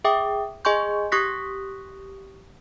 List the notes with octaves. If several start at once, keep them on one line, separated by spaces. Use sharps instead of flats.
G#4 E5 G5 D6 D#6
G#4 D#5 G#5 C6 C#6 G6
G4 C#6 D#6 F#6 A#6 B6